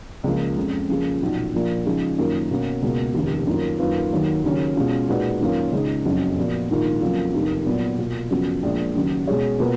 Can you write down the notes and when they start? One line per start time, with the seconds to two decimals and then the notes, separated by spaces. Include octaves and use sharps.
0.24 C#2 C#3 F3 A#3
0.57 F2 C#3 G#3
0.89 C#3 F3 A#3 F4 G#4
1.21 B1 A#2 F3
1.53 A#1 A#2 F3 A#3
1.86 C#3 F3 G#3 D#4 G#4
2.18 F#2 D#3 A#3 F4
2.51 B2 A#3 C#4 F#4
2.82 C#2 B2 A#3
3.14 F1 D#2 C#3
3.47 F#2 D#3 A#3 F4
3.79 F#2 D#3 A#3 F4 B4
4.11 D#2 D#3 F#3 A#3
4.44 D#2 C#3 F#3 C#4
4.76 B2 G#3 C#4 F4
5.08 A#2 G#3 D#4 F#4 B4
5.41 F#2 D#3 A#3 C#4 F4
5.72 C#2 C#3 G#3 D#4
6.05 F#1 F2 C#3 F#3 C#4
6.37 A#2 F3 B3 F#4
6.70 A#1 G#2 D#3 A#3 F4
7.01 F2 C#3 F#3 A#3 F4
7.34 F1 D#2 D#3 A#3
7.66 A#2 F#3 B3
7.98 B2 A#3 F4
8.30 F#2 C#3 F3 B3 F#4
8.63 A#1 A#2 G#3
8.95 D#2 C#3 F#3 C#4
9.27 B2 G#3 C#4 G#4 C#5
9.60 B2 A#3 F4 B4